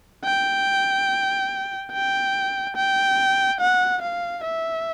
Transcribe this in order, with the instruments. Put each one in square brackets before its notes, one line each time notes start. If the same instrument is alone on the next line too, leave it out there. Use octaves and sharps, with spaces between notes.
[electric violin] G5
G5
G5
F#5
F5
E5